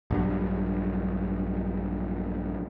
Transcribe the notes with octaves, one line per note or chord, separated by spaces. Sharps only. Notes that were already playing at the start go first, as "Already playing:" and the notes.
A#1 G2 F#3